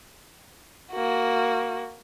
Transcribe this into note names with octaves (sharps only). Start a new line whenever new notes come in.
A#3 F#4